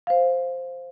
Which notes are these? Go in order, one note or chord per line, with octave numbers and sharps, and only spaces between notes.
C5 F5